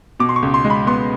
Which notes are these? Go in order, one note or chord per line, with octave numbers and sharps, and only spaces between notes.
B2 D6
C6
C#6
C#2
C6
G#3
B5
B3 C6